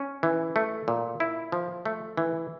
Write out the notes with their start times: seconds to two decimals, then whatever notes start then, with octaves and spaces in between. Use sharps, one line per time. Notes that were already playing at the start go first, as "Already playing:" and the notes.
Already playing: C#4
0.23 E3
0.56 A3
0.88 A#2
1.20 E4
1.52 F3
1.85 A3
2.17 E3